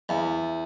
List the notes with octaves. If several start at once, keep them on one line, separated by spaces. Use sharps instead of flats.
E2